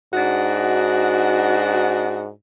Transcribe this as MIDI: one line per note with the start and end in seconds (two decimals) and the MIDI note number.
0.13 2.29 44
0.13 2.28 62
0.13 2.28 63
0.13 2.28 66